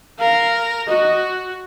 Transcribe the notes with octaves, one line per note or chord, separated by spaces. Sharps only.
A#4 F5
F#4 D#5